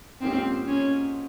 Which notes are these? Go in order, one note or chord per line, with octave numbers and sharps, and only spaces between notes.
G#2 F3 A#3 C4 C#4 G4
C#4